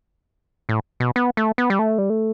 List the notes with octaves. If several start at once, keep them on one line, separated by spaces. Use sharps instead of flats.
A2
B2
B3
A3
B3
G3
A3
G3
A3